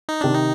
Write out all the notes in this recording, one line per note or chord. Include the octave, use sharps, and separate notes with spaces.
D#4
C3 D#3 D4
D#4